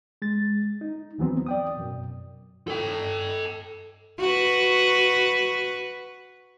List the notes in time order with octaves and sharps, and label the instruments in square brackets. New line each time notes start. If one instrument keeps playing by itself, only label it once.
[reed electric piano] G#3 A6
D#4
D#2 E3 F#3 B3 C4
D5 G5 D#6
F#2 B2
[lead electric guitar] A4 G5
[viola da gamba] F#4 B4